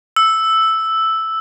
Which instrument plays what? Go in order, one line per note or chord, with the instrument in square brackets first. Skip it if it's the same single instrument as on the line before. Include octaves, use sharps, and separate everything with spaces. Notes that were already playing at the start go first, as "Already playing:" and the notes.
[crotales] E6